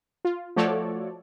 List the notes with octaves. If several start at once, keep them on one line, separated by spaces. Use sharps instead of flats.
F4
F3 A3 F#4 A4 C#5 D5